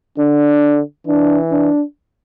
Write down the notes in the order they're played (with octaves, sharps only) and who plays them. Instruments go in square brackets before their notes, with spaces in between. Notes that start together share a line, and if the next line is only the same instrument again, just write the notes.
[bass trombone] D3 [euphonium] D4
[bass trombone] E3 [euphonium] D4
[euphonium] D4